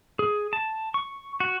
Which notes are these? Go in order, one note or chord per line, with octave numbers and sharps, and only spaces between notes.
G#4
A5
C#6
F#4